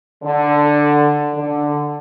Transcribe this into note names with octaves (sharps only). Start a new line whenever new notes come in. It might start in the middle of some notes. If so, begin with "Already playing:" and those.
D3
D3